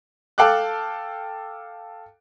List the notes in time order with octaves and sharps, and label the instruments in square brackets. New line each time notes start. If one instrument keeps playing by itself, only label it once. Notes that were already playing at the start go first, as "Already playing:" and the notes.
[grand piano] A4 F5 G5 D6 F#6